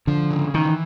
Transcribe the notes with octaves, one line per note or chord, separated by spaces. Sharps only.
D3 F3
C#3
D#3 E3